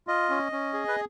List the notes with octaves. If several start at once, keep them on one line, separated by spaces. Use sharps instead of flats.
F4 D#5
C#4
C#4
G#4
B4